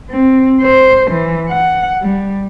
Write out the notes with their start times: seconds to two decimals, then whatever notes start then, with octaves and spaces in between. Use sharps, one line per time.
0.10 C4
0.62 C5
1.11 E3
1.49 F#5
2.01 G3